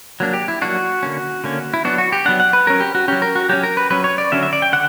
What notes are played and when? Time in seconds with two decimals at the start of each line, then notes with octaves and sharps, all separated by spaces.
0.20 F#3 A#3 D4
0.33 G4
0.48 E4
0.62 F#3 A#3 D4 F#4
1.03 D3 A#3 C#4
1.44 D3 A#3 C#4
1.74 E4
1.85 F#3 B3 D4 F#4
1.98 F#4
2.12 G4
2.26 F#3 B3 D4 F#5
2.40 F#5
2.53 B4
2.67 F#3 C#4 A#4
2.80 G4
2.95 F#4
3.08 F#3 C#4 G4
3.22 A#4
3.36 F#4
3.49 F#3 C#4 G4
3.63 A#4
3.77 B4
3.90 F#3 C#4 B4
4.04 C#5
4.18 D5
4.32 D3 F#3 C#4 E5
4.43 E5
4.53 D5
4.62 G5
4.73 D3 F#5